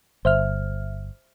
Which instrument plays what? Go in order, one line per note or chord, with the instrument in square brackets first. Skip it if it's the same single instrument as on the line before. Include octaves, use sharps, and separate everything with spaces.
[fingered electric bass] G1 [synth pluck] C5 E5 F6